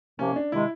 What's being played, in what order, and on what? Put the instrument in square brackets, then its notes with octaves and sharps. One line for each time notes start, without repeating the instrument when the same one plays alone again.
[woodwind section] C2 C3 F3 A#3 [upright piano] C#4
[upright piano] D4
[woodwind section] C3 D#3 G#3 [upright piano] E4